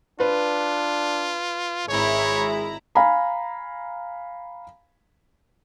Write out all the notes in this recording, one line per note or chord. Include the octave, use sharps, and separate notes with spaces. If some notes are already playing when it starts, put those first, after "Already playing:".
D4 F4 B4
G#1 G#3 E4 C#5 A#5
F5 G#5 A#5 B5